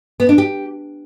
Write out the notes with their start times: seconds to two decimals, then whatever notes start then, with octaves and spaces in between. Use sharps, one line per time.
0.20 B3
0.29 D4
0.38 G4